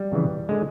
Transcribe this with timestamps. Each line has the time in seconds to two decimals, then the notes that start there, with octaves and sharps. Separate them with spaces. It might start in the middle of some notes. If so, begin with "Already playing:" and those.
Already playing: G3
0.12 F2 C#3 E3
0.49 D3 G#3